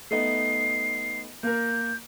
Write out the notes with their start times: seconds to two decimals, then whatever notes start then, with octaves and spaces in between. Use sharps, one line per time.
0.11 A3 B3 D#4 C7
1.43 A#3 A#4 G6